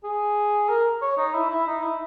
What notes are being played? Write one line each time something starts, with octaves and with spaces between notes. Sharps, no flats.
G#4
A#4
C#5
D#4
E4
E4
D#4
E4